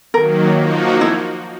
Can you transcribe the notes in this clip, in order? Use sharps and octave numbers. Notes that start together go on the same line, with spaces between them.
D#3 F#3 A#3 A#4
F3 A#3 D#4 F#4
E4